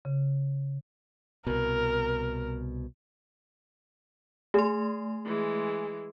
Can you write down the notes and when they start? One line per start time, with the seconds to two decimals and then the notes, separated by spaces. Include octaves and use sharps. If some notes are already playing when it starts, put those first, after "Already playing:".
0.05 C#3
1.47 C2 B2 A#4
4.54 A3 G#4 C6
5.25 E3 G#3